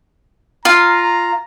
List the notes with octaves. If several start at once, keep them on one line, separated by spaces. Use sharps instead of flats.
F4 F5 A#5